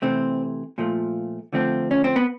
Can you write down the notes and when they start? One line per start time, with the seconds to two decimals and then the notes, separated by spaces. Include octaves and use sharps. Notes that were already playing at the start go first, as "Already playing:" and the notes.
0.02 C3 E3 A3 C4
0.78 A#2 F3 A3
1.53 D3 F3 A3 C4
1.91 C#4
2.04 C4
2.16 B3